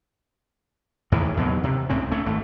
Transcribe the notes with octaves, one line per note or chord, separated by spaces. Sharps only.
E2 A2 D#3 E3
D#2 B2 F#3
C3
C#2 A2 C4 C#4
A3 C#4
G#1 A3